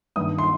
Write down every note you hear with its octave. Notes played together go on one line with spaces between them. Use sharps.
G2 D#3 D#6
C6